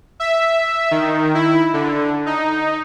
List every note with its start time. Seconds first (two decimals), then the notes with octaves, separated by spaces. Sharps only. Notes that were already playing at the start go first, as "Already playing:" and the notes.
0.20 E5
0.91 D#3
1.35 E4
1.73 D3
2.26 D#4